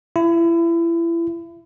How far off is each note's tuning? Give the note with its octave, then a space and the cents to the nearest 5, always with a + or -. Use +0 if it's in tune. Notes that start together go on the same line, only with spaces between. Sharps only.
E4 +30